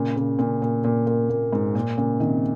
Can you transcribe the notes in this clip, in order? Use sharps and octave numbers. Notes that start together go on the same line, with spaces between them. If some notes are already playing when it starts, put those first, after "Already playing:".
Already playing: A#2 C#3
A#2 C#3
A#2 C#3
A#2
A#2
A#2
A#2
G#2
A#2
A#2 C#3
C3 D#3